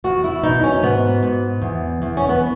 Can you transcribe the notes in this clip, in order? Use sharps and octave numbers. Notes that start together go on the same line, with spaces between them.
E2 F#4
E4
B2 D#4
C#4
C#4
G#2 B3
G#2
E2
E2
C#4
B3